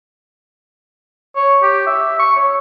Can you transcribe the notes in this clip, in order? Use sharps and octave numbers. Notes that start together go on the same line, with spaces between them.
C#5
G4
E5
C#6
C#5